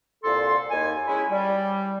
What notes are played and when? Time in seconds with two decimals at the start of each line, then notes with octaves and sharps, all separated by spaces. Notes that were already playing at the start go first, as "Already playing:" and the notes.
0.24 C2 A#2 A4 C6
0.70 D#2 G#5
1.08 G#3 C#4 E4
1.29 G3